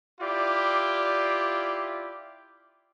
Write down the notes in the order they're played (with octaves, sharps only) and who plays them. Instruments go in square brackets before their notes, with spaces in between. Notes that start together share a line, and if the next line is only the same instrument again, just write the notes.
[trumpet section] E4 F4 G4 D5